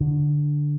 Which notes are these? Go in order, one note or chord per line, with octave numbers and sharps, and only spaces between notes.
D3